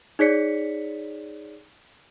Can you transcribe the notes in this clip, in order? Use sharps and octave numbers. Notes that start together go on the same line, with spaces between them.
D#4 G#4 C#5 D5 B6 C#7